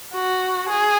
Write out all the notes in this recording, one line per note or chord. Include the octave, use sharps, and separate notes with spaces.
F#4
G#4